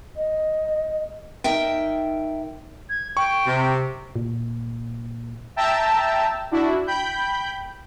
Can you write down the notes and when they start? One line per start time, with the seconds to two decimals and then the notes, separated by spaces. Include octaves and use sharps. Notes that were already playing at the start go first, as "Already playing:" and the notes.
0.16 D#5
1.44 D#4 A#4 E5 G5
2.89 G#6
3.17 G5 C#6
3.46 C3
4.16 A#2
5.56 E5 G5 A5 A#5 E6
6.51 D4 E4 F#4
6.87 G5 B5 G6